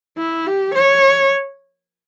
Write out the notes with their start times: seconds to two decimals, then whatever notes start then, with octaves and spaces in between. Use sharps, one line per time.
0.18 E4
0.47 G4
0.74 C#5